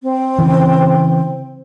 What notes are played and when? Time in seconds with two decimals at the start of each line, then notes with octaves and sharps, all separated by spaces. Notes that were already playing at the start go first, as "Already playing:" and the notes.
0.03 C4
0.39 C#3 E3